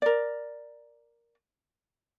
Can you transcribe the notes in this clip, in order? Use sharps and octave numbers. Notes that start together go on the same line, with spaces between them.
A#4 D5